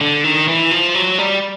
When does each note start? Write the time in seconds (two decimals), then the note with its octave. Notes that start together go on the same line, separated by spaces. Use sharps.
0.01 D3
0.24 D#3
0.48 E3
0.71 F3
0.95 F#3
1.19 G3